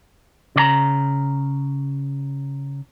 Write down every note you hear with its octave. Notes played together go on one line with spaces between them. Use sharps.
C#3 D5 A#5